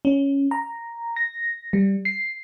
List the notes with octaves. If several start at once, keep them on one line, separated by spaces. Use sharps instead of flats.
C#4
A#5
A#6
G3
C7